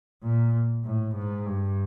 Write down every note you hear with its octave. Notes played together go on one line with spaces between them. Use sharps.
A#2
A2
G#2
G2